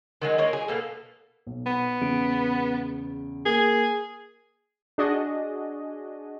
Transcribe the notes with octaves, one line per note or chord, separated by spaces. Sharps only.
D#3 F#3 G#3 D#4
G#3 A#3 A#4 C#5
G#4
B2 A#3 A4
B1
B3
E2 C#3 D7
A#3 G#4
D4 F#4 G#4 D#5